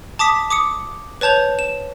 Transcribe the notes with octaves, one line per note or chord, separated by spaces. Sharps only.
A5 D6 D#6 B6
D6 D#6 C#7
B4 C#5 A5 G6 F7
E7